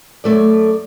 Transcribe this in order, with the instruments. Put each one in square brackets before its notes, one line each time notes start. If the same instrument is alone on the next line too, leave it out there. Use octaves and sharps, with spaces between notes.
[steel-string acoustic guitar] F#2 A3 D5